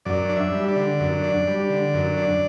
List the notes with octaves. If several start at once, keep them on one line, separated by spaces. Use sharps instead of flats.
F#2 D5
D4
E5
G3
D5
D3
F#2
D4
G3
D3
F#2
D4